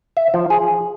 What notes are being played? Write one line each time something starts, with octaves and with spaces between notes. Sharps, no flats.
E5
F3
G#4